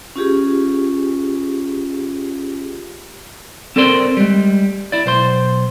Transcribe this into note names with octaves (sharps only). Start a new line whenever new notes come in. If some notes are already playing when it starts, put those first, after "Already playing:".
C#4 F4 G4 G#4
C4 A4 A#4 C5 D5 C6
G3 G#3
E4 D5
B1 C5 C6